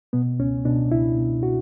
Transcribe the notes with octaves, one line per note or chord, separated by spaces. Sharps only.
B2 B3
C#2 C#4
B2 D4
C#2 E4
B2
F#4